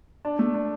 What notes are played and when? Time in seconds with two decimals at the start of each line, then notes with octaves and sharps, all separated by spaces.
0.25 D4
0.39 A3
0.54 D4